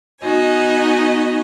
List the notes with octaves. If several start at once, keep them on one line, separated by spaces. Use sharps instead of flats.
B3 D#4 F#4 D#5 G#5